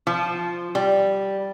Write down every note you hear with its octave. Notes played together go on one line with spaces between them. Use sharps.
F3
G3